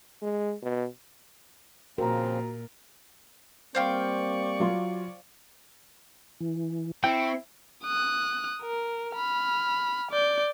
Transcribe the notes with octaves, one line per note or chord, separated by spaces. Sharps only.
G#3
B2
A#2 C#3 F3 C4 F#4 A#4 A#5
G3 A#3 C4 C5 D5 F5 G5 C#6
F#3 F4
E3
C4 E4 G5 C#6
D#6 F#6
A#4
B5 F6
D5 G6